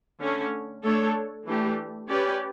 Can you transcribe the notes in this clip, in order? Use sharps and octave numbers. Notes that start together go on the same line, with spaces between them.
D3 A3 C#4
A3 D4 A4 C#5
E3 A3 D4 G4
C#4 G4 B4 D5